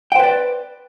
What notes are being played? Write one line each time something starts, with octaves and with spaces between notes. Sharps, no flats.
B4 C5 D5 G5